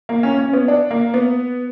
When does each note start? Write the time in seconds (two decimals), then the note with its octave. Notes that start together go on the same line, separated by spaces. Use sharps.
0.09 A#3
0.23 C#4
0.38 C#4
0.53 B3
0.68 D4
0.91 A#3
1.14 B3